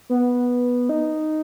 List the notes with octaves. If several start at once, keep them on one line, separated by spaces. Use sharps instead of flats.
B3
D#4